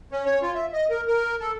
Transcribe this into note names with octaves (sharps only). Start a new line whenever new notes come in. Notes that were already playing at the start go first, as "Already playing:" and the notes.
C#4
C#5
F4
E5
D#5
A#4
A#4
A4